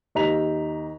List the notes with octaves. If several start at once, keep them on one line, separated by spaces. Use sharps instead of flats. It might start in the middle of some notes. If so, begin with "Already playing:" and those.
D#2 D#4 A#5 B6 F7